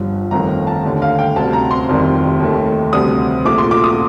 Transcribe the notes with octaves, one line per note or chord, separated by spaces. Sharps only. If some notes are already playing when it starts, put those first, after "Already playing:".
Already playing: G1 G2 F3
G1 F2 D#3 A3 A#5
A5
D#2 D3 A3
F5
G5
D2 C3 G3 A5
A#5
C6
F1 F2 D#3 G3
D#2 D#3 A3
D2 C3 G3 D#6
A#1 A#2 A3 D6
C6
D6
D#6